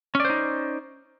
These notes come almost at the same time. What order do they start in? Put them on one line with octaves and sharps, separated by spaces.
C#4 D5 C5 D#4